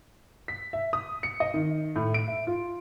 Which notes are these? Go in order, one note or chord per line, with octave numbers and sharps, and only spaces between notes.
B6
E5
D#6
C#7
D#5
D#3
A2
D7
E5
F4